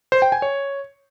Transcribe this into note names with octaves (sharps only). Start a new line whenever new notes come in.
C5
G5
G#5
C#5